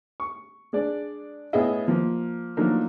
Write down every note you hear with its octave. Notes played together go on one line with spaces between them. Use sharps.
C#6
G#3 D4 D5
A2 B3 G#4 D#5 E5
F3 A#3
F3 F#3 A3 A#3 D4 D#4